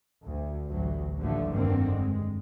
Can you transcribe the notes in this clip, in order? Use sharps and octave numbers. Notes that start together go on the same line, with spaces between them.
D2
A1 D2 F#3
A1 D#2 D3 F3 F#3 A3
F1 G2 D3 D#3 A#3 C4
G#3